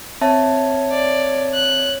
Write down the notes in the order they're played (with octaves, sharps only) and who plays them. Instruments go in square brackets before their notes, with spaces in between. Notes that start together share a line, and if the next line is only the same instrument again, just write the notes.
[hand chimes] C4 E5 A5 [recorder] C#5
[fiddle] D5
F#6